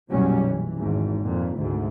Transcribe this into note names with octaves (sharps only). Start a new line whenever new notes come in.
F#1 B1 A#2 F#3 G3 C#4
E3
G#1 E2 G#2
F2 A#2
F1 D2 G#2